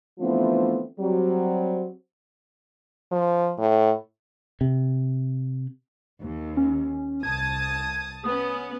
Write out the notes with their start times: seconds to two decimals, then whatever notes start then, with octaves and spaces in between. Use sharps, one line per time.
0.19 D3 E3 F3 A3 B3 C4
0.99 F#3 G3 C4
3.12 F3
3.59 A2
4.61 C3
6.21 D#2
6.57 C#4
7.23 C2 A5 D#6 G#6
8.24 B3 C#4 D#6